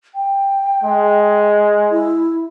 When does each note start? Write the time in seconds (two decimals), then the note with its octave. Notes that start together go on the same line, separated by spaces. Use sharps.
0.15 G5
0.84 G#3
1.91 E4